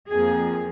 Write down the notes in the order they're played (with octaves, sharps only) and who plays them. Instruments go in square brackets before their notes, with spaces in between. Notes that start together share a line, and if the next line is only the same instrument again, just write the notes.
[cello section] F2 F3 A#3 G#4